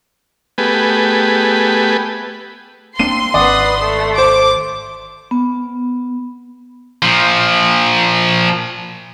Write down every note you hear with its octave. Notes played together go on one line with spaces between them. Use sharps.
A3 B3 G4 G#4 B4
A#3 C4 D4 C6 C7 D#7
G#1 D#3 B4 D5 F#5 D#6
A3
C5 D6
B3
A#2 F3